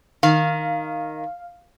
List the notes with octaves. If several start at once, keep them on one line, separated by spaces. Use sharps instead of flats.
D#3 F5